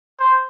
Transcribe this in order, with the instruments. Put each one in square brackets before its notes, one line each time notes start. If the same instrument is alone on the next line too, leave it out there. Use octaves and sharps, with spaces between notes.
[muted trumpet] C5